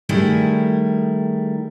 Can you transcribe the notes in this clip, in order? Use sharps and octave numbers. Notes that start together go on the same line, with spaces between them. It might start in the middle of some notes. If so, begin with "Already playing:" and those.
D#3 G3 A3 E4 G#4